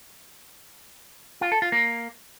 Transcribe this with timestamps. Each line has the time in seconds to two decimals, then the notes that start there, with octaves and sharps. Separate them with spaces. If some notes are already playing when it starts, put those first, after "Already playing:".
1.41 F4
1.52 A4
1.62 F4
1.72 A#3